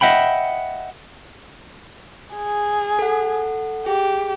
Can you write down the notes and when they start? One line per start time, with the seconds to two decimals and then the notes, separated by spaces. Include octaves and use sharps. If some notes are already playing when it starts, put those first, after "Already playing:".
0.01 D#5 E5 F#5 G5 B5
2.36 G#4
2.99 A4 F#5
3.86 G4 G#4